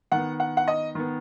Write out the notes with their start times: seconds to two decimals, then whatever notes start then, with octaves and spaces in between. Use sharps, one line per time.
0.12 D#3 B3 F#5
0.40 F#5
0.57 F#5
0.68 D#5
0.95 D#3 B3